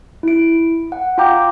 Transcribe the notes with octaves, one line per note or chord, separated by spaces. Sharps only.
E4 D7
F#5
F4 F5 G5 A#5 D6 G6